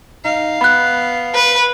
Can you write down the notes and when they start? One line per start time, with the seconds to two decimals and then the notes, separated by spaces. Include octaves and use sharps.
0.25 D#4 F5
0.61 B3 B5 F#6
1.35 B4